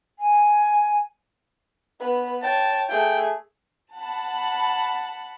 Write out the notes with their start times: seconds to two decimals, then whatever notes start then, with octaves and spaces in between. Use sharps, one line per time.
0.19 G#5
2.00 B3 B4
2.43 C#5 G5 A5
2.89 A3 G#4 G5
3.96 F#5 A5 B5